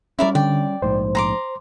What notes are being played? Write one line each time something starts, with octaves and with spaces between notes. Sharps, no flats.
G3 C#4 E4 A#4 D5
D3 D5 G5
A#1 G#2 C5
A#5 C6 D6